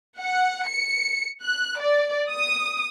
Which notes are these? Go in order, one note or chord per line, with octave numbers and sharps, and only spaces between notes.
F#5
C#7
F#6
D5
D#6